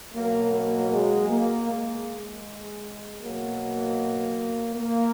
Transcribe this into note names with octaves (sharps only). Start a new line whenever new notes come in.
B2 F#3 A#3
A#3
G#3
A#3
G#3
B2 F#3 A#3
A#3